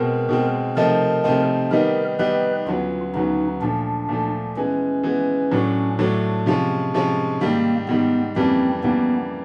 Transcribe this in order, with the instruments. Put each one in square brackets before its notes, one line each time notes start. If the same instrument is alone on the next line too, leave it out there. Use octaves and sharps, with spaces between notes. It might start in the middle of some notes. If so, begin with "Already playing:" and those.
Already playing: [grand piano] B2 G#3 C4 [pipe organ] A#4
[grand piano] B2 G#3 C4
[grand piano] C3 F3 A3 C4 D#4 [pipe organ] A#4
[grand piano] C3 F3 A3 C4 D#4
[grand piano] D#3 G3 B3 D#4 [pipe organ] A#4
[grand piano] D#3 G3 B3 D#4 [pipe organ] B4
[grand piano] D2 C#3 F#3 B3 [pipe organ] F4
[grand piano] D2 C#3 F#3 B3 [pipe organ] D#4
[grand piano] A#2 F3 A3 [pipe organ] D4
[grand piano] A#2 F3 A3
[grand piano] E3 G#3 B3 [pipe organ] C#4
[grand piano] E3 G#3 B3
A2 F#3 A3 D4
A2 F#3 A3 D4
C3 F3 G#3 C#4 F4
C3 F3 G#3 C#4 F4
[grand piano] G#2 D#3 G3 [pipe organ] A#3
[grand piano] G#2 D#3 G3 [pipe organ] B3
[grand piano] F2 C#3 E3 G3 A#3 [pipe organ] C4
[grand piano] F2 C#3 E3 G3 A#3 [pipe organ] B3